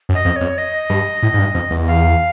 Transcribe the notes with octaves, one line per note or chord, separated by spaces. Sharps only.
F#2
D#5
F2
F2 C#5
D#5
G2
A2
G#2
G2
F2
E2
F5